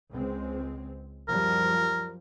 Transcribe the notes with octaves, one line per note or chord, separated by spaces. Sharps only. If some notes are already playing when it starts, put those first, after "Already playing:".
C#2 G#3 C4
F#2 F3 G3 A#4